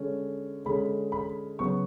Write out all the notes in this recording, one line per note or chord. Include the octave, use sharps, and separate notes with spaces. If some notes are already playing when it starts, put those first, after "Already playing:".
Already playing: D3 G#3 C#4
D3 G#3 C#4 B5
B5
C#3 F#3 B3 C#6